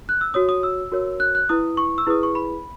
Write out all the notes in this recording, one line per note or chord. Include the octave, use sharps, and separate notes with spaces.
F#6
E6
F#4 C#5 D#6
D#6
E6
F#4 A#4 C#5
F#6
F#6
E4 B4 D#6
C#6
E6
E4 G#4 B4 D#6
C#6
B5